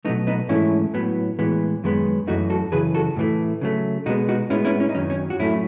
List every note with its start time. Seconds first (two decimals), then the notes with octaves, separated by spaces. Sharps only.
0.05 B2 F#3 A3 B3 D#4
0.27 B3 D#4
0.49 G#2 E3 A3 C#4 E4
0.94 A2 F#3 B3
1.39 A2 E3 G#3 B3
1.84 F#2 D#3 G#3 B3
2.27 F#2 E3 A3 D#4 F#4
2.50 F#4 A4
2.72 F#2 C#3 E3 G#4 B4
2.94 F#4 A4
3.16 A2 E3 A3
3.61 C#3 F#3 A3
4.06 B2 G#3 B3 D#4 F#4
4.29 D#4 F#4
4.50 A2 G#3 B3 C#4 E4
4.65 C#4 E4
4.80 C#4 E4
4.89 D#4
4.94 F#2 D#3 F#3 C#4
5.10 C#4
5.30 F#4
5.39 A2 F#3 A3 C#4 E4